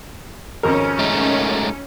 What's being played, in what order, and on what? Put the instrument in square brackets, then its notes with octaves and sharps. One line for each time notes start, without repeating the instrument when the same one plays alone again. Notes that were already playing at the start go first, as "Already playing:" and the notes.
[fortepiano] G#1 F2 A#4 [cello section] C#4
[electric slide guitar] G#3 A3 D#4